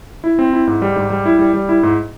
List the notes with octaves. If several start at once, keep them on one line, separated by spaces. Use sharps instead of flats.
E4
C4
E4
G#2
G3
G#2
G3
E4
G3
G3
E4
G#2